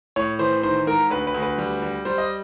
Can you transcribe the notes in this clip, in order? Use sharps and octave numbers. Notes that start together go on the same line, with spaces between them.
A2 C#5
E3 C5
D#3 C5
G#2 A#4
D2 B4
B4
D2
B4
G3
G3
G3 C5
D#5